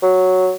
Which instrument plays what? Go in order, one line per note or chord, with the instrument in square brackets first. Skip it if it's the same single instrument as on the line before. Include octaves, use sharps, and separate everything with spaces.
[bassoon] F#3